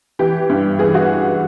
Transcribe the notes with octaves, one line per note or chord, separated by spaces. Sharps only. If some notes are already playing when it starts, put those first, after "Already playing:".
E3 G4
G2
E3 G#4
F#4